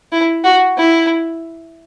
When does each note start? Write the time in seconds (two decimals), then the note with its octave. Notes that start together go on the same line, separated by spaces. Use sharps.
0.12 E4
0.44 F#4
0.78 E4